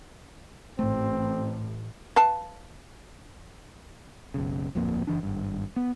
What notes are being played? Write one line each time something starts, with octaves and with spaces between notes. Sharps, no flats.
A1 G#2 A3 C4
B4 F5 A5
F#1 B1 C#3
D1 A#1 F2 A#3
F#1 E3 D4
G#1 G2
B3